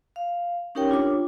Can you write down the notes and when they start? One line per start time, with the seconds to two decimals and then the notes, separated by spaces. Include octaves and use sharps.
0.16 F5
0.75 C#4 D#4 G4 A#4 C#5 G5
0.90 D4 F4 C#5 D6